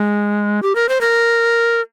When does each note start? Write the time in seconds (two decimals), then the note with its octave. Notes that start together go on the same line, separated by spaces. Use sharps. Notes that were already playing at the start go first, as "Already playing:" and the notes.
Already playing: G#3
0.63 G4
0.75 A#4
0.89 C5
1.01 A#4